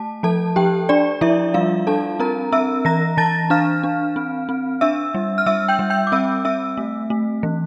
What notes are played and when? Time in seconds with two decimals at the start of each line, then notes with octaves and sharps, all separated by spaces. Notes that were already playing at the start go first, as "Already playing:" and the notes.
Already playing: A3 A5
0.23 F3 A4 A5
0.56 F3 G4 G5
0.89 D4 D5
1.21 F3 E4 E5
1.54 G3 F4 F5
1.87 D4 A4 A5
2.20 C4 A#4 A#5
2.52 C4 E5 E6
2.85 E3 A#5 A#6
3.17 E3 A5 A6
3.50 D4 F5 F6
3.83 D4
4.16 C4
4.49 C4
4.81 D4 E5 E6
5.15 G3
5.38 F6
5.46 G3 E5 E6
5.68 G5 G6
5.79 G3
5.90 G5 G6
6.07 D6
6.12 C4 E5 E6
6.45 C4 E5 E6
6.77 A3
7.10 A3
7.43 E3